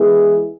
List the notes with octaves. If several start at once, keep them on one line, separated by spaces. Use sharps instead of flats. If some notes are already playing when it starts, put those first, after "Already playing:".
Already playing: E3 G#3 B3 E4 G#4